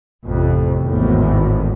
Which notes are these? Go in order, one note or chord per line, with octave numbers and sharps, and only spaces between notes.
A1 F2 C3
G#1 E2 A2